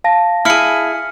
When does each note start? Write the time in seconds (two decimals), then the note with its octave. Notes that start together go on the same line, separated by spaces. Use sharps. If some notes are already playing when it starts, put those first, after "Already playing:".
0.04 F5 A5 A#6
0.45 E4 G#4 F6 C#7